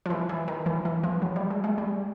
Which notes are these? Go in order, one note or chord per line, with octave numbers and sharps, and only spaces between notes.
F3
E3
E3
D#3
E3
E3
F3
F#3
G3
G#3
G#3
G3